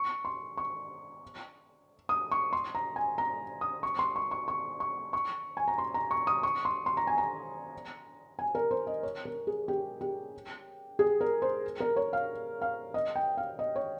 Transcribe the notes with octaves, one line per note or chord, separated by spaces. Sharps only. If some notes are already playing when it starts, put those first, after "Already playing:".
Already playing: C#6
C6
C#6
D#6
C#6
C6
A#5
G#5
A#5
D#6
C#6
C6
C#6
C#6
C#6
C#6
C#6
G#5
A#5
C6
A#5
C#6
D#6
C#6
C6
C6
A#5
G#5
A#5
G#5
A#4
C5
D#5
C#5
A#4
G#4
G4
G4
G#4
A#4
C5
A#4
C#5
F5
F5
D#5
G5
F5
D#5
C#5